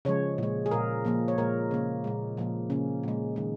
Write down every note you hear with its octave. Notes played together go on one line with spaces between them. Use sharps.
C#3 F3 G#3 C#5
A#2 G#3
G#4
A#2 A#3 A#4
A#2 F3 A#3
C#5
A#2 G#3 A#4
C#3 A#3
A#2 G#3
A#2 F3 A#3
C#3 A#3 C#4
A#2 G#3
D#3 G#3